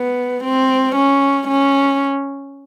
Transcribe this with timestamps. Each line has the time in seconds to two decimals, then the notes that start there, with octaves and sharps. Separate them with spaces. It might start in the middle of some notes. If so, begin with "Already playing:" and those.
Already playing: B3
0.43 C4
0.95 C#4
1.47 C#4